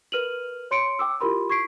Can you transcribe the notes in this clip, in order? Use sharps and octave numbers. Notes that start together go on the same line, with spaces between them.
A#4 B4 F6 D#7 F7 F#7
C#5 C6 C#7 D7
G5 D6 E6
E4 F4 G4 A#4 B5 C6
C#6 G#6 B6 C7 D7